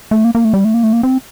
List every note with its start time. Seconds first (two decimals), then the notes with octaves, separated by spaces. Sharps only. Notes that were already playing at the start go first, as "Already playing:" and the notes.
0.11 A3
0.25 A#3
0.35 A#3
0.44 A3
0.54 G3
0.64 A3
0.74 A#3
0.83 A3
0.93 A#3
1.03 C4